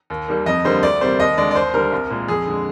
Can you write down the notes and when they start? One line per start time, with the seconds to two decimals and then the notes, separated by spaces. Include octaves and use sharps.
0.10 D#2
0.28 D#3 G3 A#3
0.46 F2 D#5
0.65 D3 G3 A#3 C5
0.83 D2 D5
1.01 C3 G3 A#3 C5
1.20 D#2 D#5
1.37 D3 G#3 D5
1.51 D5
1.55 D#2 C5
1.74 D3 G3 A#4
1.92 C2
2.10 A#2 G#3
2.28 F2 G#4
2.47 D3 G#3